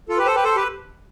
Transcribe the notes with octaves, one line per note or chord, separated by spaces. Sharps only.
F4 A4
G4 B4
A4 C5
G4 B4
A4 C5
G4 B4